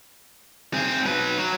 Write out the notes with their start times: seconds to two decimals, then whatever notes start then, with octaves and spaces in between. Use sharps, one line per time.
0.74 C4 G#4
1.06 F#3 B4
1.38 F#3